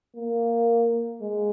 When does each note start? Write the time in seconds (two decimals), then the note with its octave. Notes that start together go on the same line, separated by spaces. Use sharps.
0.16 A#3
1.22 G#3